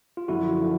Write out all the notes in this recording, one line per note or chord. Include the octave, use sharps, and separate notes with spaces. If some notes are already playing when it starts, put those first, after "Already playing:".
F4
F#2 D3 F3 E4 F#4
D3 F3